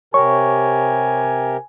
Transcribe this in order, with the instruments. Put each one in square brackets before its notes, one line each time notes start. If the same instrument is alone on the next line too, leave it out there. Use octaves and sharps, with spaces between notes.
[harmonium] C3 G4 A#4 [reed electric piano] C#5 C#6 [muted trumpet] G#5